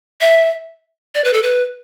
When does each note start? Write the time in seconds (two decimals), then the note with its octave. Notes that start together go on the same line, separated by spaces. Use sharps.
0.21 E5
1.15 D5
1.24 B4
1.33 A4
1.43 B4